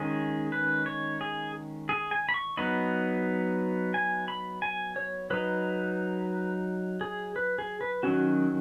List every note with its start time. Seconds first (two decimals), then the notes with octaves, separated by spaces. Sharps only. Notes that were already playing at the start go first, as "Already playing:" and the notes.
Already playing: D#3 G#3 C#4 G#4
0.52 B4
0.86 C#5
1.21 G#4
1.89 G#4
2.11 G#5
2.29 B5
2.34 C#6
2.57 F#3 B3 D#4 B5
3.94 G#5
4.28 B5
4.62 G#5
4.96 C#5
5.30 F#3 D#4 B4
7.01 G#4
7.36 B4
7.59 G#4
7.81 B4
8.03 D#3 F#3 C#4 F#4